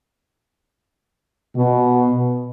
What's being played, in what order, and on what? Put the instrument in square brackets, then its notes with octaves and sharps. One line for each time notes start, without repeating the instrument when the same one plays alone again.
[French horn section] B2